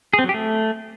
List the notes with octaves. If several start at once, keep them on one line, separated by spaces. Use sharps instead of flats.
G#4
C4
F#3
G4
A3